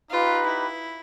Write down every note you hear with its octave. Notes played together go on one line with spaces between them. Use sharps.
D#4 F4 G4 B4
E4